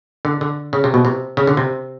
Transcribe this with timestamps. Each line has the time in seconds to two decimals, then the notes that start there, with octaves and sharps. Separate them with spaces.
0.25 D3
0.41 D3
0.73 C#3
0.84 C3
0.94 B2
1.05 C3
1.37 C#3
1.47 D3
1.57 C3